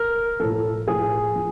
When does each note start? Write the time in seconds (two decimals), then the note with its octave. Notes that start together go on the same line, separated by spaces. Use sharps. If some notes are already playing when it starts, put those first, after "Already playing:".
Already playing: A#4
0.40 A2 F3 A4
0.87 A2 F3 G#4
1.36 F3